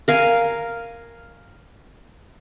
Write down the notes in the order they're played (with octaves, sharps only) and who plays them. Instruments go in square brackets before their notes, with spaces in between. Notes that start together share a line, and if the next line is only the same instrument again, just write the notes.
[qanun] A#4 F5 G#5